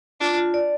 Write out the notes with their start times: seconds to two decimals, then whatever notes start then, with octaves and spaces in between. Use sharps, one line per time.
0.20 D4 F4
0.37 F4
0.54 D5